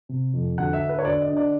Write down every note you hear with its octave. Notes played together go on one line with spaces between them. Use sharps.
C3
F2
D2 F#5
E5
D3
B4
C#5
D2 D5
D#5
D3
D5